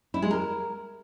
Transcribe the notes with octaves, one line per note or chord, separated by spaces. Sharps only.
E4
G#3
A#4